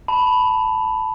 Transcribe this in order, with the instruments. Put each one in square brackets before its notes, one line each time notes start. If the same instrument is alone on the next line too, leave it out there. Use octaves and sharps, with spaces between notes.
[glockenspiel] A5 B5